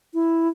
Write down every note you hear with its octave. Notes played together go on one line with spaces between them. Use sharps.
E4